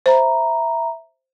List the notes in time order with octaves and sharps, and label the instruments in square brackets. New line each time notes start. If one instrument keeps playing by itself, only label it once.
[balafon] C5 [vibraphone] E5 A#5 B5